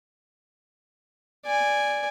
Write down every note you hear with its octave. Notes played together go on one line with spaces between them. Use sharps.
D5 G#5